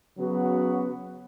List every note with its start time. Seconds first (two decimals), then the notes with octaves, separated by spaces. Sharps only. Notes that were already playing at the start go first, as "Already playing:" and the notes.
0.18 C#3 F#3 B3 F#4